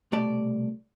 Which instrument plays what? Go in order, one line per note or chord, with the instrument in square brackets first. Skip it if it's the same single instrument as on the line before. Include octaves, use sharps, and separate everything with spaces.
[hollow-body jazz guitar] C2 B2 A3 G4 D5 A5